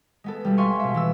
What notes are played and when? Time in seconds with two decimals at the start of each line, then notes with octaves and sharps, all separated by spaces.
0.24 G#3 B3 A4
0.45 B1 G3
0.58 E5 F5 G#5 C6 C#6
0.79 B2 E5
0.94 E3 B3 E6